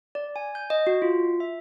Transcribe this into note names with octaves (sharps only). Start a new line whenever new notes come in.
D5
G#5
G6
D#5
F#4
F4
E5